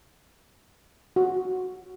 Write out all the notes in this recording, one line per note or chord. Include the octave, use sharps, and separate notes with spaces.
F#4